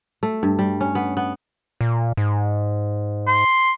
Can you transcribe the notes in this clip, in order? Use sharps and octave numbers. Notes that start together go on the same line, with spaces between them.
A3
G2
G3
C#4
B3
B3
A#2
G#2
C6